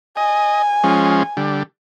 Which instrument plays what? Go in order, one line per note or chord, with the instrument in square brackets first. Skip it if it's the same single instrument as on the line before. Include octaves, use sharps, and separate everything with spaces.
[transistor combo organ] D#5 [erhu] G#5
[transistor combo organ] F3 G#3 C#4
D3 G3